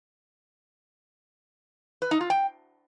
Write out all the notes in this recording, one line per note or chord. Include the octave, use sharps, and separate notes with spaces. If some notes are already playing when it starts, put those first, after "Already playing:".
B4
D#4
F4
G5